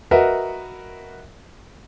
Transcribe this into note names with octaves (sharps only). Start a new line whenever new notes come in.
F#4 A#4 B4 D#5 E5 F#5